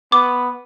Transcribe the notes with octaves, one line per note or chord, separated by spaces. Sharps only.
B3 D6